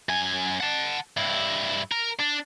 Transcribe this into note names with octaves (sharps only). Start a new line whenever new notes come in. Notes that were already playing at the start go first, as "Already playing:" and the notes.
F#2 G#5
F#5 A5
G2 E4
A#4
D4